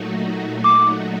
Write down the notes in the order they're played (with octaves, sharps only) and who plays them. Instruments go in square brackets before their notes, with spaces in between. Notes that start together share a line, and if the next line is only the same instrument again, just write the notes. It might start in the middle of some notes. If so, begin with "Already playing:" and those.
Already playing: [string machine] A#2 F#3 A3 D#4 F#4
[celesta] D6